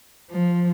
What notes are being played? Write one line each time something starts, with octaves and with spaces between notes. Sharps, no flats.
F3